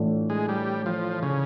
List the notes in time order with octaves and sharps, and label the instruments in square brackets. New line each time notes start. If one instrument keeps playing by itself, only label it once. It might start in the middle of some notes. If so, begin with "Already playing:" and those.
Already playing: [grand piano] A2 E3 A3 D4 F4
[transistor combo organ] G#3
G3
F3
C#3